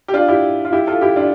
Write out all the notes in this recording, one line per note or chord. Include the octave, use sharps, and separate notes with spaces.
G4
D4 F4
E4 G4
F4
E4 G4
F4 A4
E4 G4
D4 F4